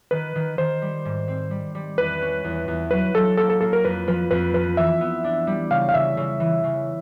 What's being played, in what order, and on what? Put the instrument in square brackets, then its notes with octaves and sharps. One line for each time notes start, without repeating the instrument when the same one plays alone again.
[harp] D#3 [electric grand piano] B4
[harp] D#3
[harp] D#3 [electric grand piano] C5
[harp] G3
G#2
C4
G3
G3
[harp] E2 [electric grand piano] B4
[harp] C#4
E2
E2
[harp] F#3 [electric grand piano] B4
[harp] F#3 [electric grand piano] A4
[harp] A#3 [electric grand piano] A4
[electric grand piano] A4
[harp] A#3 [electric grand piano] A4
[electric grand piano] A#4
[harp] F2 [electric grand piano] B4
[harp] F3 [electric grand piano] B4
[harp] F2 [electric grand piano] B4
[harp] F3 [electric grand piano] B4
[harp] E3 [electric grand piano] E5
[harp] B3
D4
G3
[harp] C#3 [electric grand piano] F5
[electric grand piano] F5
[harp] C#3 [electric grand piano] E5
[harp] C#3
E3
C#3